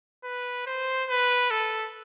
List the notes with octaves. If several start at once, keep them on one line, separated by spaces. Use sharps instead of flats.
B4
C5
B4
A4